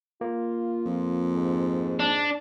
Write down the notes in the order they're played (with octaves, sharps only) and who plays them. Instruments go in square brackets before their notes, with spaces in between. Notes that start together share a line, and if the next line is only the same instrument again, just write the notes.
[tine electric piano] A#3 [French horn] F4
[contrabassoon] F2
[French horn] G#2
[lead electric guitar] D4